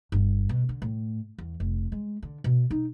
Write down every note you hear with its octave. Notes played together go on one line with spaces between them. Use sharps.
G1
B2
D3
A2
E2
F1
G#3
D3
B2
D#4